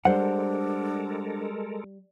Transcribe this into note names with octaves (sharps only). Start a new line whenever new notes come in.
G3 G#3 D4 A4 A#4 C5 F#5